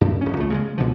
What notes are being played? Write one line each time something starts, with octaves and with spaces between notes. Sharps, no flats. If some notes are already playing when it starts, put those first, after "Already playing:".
F#2
D1 C#4
C#2 A3
C#3 G3 G#3
C#2 B2 D3 F3